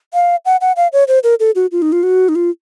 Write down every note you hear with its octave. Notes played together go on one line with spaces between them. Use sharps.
F5
F#5
F#5
F5
C#5
C5
A#4
A4
F#4
F4
D#4
F4
F#4
D#4
F4